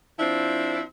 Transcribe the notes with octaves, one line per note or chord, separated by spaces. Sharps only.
F3 C4 D4 E4